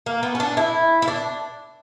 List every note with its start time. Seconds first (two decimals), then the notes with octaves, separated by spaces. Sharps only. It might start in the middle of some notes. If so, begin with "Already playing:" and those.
0.06 A#3
0.23 B3
0.35 C#4
0.40 D4
0.57 E4
1.02 E4
1.08 D4